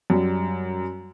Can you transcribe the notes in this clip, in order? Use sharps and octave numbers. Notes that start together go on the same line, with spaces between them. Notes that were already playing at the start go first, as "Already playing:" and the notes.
F#2 G3